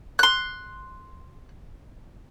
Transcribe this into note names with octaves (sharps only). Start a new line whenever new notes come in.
C6 F#6